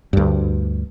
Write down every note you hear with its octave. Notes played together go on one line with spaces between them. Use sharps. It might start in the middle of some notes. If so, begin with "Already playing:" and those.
D2 G2